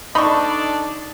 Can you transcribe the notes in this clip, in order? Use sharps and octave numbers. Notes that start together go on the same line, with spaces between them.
D4 D#4 A4 D5 B5 C#6